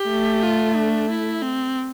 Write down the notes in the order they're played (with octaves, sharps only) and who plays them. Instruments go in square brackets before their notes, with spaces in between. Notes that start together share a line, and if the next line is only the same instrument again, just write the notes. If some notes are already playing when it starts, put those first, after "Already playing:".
Already playing: [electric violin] G4
[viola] A3
[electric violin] F4
D4
E4
C4